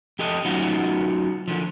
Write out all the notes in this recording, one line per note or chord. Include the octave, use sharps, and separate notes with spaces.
F2 G4 A4 D#5
F#3 C#4 D#4 F4 F#4
D3 F3